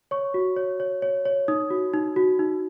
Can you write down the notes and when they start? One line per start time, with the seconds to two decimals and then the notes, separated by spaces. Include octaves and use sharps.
0.11 C#5 C#6
0.34 F#4
0.56 C#5
0.80 C#5
1.02 C#5
1.25 C#5
1.48 D#4 D#6
1.70 F#4
1.94 D#4
2.16 F#4
2.39 D#4